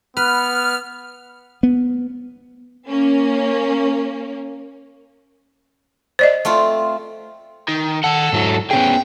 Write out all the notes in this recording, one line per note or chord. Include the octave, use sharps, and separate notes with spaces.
B3 B4 F6
B3
A#3 C#4
C5 D5 D#5
A3 C4 F4
D#3
D#3 A4 F#5
G#2 F#3 E4
B3 C#4 G#4 G5